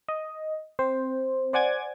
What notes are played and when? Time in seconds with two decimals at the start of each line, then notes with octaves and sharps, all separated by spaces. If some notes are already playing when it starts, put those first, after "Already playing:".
0.09 D#5
0.79 C4 C5
1.53 C5 D5 F#5 G#5 D6 G#6